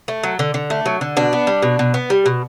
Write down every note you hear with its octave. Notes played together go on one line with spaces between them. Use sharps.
A3
F#3
D3
D3
A3
F#3
D3
B2 D4
B3
G3
B2
B2
B3
G3
B2